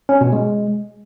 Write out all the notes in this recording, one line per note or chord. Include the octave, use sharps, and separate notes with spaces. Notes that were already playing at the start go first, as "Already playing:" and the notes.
C#4
B2
G#3